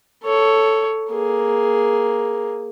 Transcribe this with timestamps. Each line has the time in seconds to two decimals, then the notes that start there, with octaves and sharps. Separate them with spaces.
0.24 A4 C#5
1.12 A#3 G#4